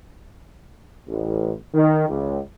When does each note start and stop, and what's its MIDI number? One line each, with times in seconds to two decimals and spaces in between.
1.07 1.52 33
1.74 2.05 51
2.08 2.41 37